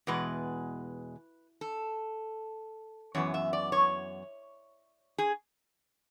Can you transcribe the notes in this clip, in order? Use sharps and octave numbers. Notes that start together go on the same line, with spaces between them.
E2 B2 G#3 B4
A4
F#2 E3 B3 C#5
E5
D5
C#5
G#4